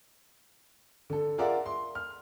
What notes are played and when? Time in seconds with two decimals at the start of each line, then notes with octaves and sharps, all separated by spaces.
1.10 D3 A4
1.38 F4 G#4 A#4 D5 E5 F#5
1.66 C6
1.95 F6